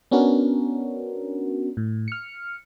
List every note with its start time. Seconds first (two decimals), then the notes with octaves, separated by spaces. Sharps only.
0.11 B3 C#4 D4 F#4 A#4
1.77 A2
2.08 F6 C#7